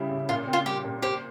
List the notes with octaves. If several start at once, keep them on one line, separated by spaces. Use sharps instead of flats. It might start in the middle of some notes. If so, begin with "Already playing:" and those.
Already playing: C#3 G3 E4
C#3
A#2 F4
C4
F4
G3 G4
A#2
G4 C5